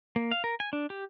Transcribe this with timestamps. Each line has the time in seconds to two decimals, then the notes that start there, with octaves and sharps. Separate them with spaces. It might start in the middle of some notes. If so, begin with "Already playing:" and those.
0.16 A#3
0.31 F5
0.44 A#4
0.60 G#5
0.73 D4
0.90 G4